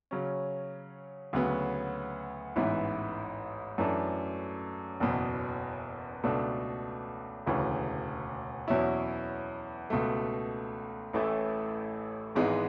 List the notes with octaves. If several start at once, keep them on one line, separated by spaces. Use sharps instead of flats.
C#3 F#3 C#4
D2 C#3 F#3 B3
A1 G#2 E3 B3 E4
F#2 E3 A3 D4 A4
F#1 E2 B2
C#2 B2 A3 D4 A4
E1 D2 C#3 E3
E2 B2 F#3 C#4 E4
C#2 B2 A3
A1 A2 E3 A3 E4
G#1 G#2 E3 G#3 B3